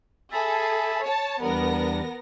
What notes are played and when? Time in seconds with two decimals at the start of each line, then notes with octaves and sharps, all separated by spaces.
0.32 G#4 A4 E5 A5 B5
1.03 C#5 A5
1.42 E2 G3 B3 D4 A#4 A#6